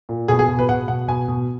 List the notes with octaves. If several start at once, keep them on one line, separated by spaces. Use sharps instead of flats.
A#2
B2 G#4
G#4
B2
B4
B2 F#5
B2 F#5
B2 G#5
B2